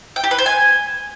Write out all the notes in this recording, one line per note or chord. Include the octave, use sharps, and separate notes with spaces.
G5
G4
B4
C5
G#5